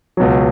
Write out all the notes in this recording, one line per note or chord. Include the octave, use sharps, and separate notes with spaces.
C#2 B2 F#3